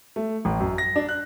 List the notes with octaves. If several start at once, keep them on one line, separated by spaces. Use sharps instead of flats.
A3
A1
F#2
A#6
D4
F#6